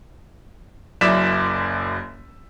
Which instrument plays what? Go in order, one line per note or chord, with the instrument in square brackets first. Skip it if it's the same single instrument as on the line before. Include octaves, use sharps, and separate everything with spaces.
[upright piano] F#1 F#2 E4 D5 B6 E7